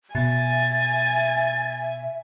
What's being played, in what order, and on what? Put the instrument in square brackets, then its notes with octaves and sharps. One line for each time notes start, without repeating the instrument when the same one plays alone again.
[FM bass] B2 [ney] E5 [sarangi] G#5 [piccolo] A6